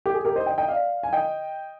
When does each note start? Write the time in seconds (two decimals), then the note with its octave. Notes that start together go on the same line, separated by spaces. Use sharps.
0.06 G4
0.14 G#4
0.25 G4 A#4
0.36 C5 D#5
0.46 D#5 G5
0.58 D#5 G5
0.68 D5 F5
1.03 G#5
1.13 D#5 G5